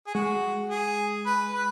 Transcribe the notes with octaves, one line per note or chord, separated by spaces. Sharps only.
G#4
G#3 F#4
G#4
B4
B4